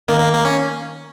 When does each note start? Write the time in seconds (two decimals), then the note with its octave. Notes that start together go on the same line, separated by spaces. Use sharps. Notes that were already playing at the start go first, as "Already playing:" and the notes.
0.08 D#3 A#3
0.20 A#3
0.33 A#3
0.45 C#4